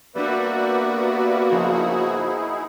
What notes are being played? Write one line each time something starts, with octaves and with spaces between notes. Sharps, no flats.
G3 A#3 B3 D4 F#4 B4 D5 E5
F#2 C#3 F3 D#4 E4 G#4